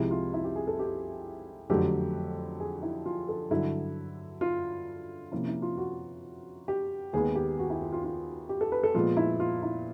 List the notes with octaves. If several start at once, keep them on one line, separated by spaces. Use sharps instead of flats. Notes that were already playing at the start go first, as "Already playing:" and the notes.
Already playing: C2 C3 F3 G#3 E4
F4
E4
G4
G#4
A4
G4
F2 D3 F#3 A3 G4
G#4
E4
F4
A4
G2 D3 F#3 E4
F4
C3 F3 A#3 C#4 E4
E4
F4
F#4
G4
D#2 D#3 G#3 B3 G#4
G4
F#4
E4
F4
F4
F4
G4
A4
B4
A4
A#2 F3 G#3 B3 F4
E4
F4
E4